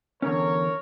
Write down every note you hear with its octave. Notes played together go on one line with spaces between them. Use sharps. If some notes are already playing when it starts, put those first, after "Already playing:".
E2 D3 C#4 A#4 C#5